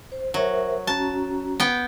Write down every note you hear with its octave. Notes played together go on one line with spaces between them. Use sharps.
C5
F#3 A#4 C5 E5
C#4 F#4 A5 A#5
B3 G5